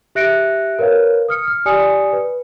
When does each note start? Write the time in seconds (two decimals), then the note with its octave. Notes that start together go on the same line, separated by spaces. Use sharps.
0.15 G4 E5 F#6 A#6 C#7 D7
0.79 A#4 B4 C#5 F5
1.28 D#6 F6 C#7
1.48 F6
1.66 G4 D5 G#5 D#6 C#7
2.13 B4